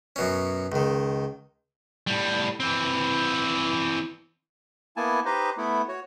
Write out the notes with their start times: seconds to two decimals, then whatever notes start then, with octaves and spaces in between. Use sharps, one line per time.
0.16 F#2 B2 C#4
0.72 C#2 D#3
2.07 A2 G3
2.60 E3 C4
4.97 A#3 B3 E4 G#5 A5
5.25 D#4 G4 B4 C5 D#5
5.58 A3 B3 E4
5.88 F#4 C#5